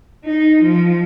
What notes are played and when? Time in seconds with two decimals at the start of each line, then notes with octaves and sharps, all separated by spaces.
0.25 D#4
0.62 F3